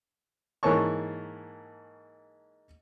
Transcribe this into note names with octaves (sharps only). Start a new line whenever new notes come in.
G#2 E3 A#3 C#5 A5 C#6